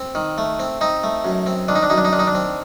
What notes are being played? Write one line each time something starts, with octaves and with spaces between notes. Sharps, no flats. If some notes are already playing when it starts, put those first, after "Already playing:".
Already playing: C4
D#3
A3
C4
C4 D#4
A3
F#2
C4
D#3 D4
D#4
D4
F#2 D#4
D4
D#4
D#3 D4
D#4
D4
C4